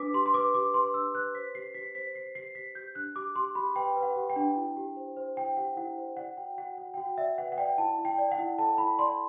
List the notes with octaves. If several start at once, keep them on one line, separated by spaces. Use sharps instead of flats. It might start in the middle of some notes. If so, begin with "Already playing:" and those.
Already playing: D4 B4 D6 B6
G4 C6
C6
B4 D6
G4 D6
B4 C6
D4 E6
B4 F#6
C5 B6
G4 C7
G4 B6
C5 B6
C5 C7
G4 C7
G4 B6
G4 G6
D4 F#6
G4 D6
G4 C6
G4 B5
B4 G5
B4
F#5
G4
G5
D4
E4
G4
C5
C5
E4 G5
G4 F#5
E4 F#5
C5
D5 F#5
F#4 G5
F#4 F#5
F#4 F#5
G5
F#4 F#5
D5 E5
B4 F#5
F#5
D5 G5
E4 A5
E4
G5
D5
F#5
E4
A4 A5
E4 B5
D5 C6